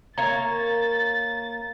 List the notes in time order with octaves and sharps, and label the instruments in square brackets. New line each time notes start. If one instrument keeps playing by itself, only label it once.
[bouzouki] A#3 C#5 [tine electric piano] A#5 [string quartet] A6